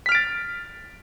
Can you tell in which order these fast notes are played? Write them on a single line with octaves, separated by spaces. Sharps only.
B6 F6 D7 A6